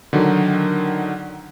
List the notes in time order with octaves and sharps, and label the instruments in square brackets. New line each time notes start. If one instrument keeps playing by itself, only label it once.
[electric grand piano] D3 D#3 F#3